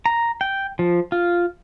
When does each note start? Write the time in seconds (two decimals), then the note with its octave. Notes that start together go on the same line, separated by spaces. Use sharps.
0.06 A#5
0.41 G5
0.79 F3
1.12 F4